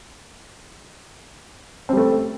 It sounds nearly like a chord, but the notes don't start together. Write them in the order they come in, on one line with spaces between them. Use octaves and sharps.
C4 G3 A3